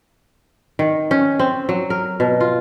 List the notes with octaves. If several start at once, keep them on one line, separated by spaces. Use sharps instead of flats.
D#3
C#4
C4
F#3
A#4
B2
F4